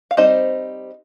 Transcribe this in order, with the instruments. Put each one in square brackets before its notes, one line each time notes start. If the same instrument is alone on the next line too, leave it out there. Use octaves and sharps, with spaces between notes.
[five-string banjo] F5
G3 C4 D#4 C5 D#5